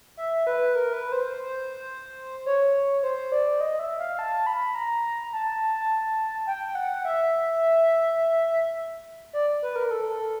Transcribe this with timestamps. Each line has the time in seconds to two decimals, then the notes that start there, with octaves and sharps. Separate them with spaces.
0.17 E5
0.47 B4
0.75 A#4
0.93 B4
1.12 C5
1.33 C5
2.46 C#5
3.03 C5
3.32 D5
3.61 D#5
3.79 E5
3.99 F5
4.19 A5
4.47 B5
4.75 A#5
5.33 A5
6.47 G5
6.75 F#5
7.05 E5
9.33 D5
9.63 B4
9.76 A#4
9.91 A4
10.09 A4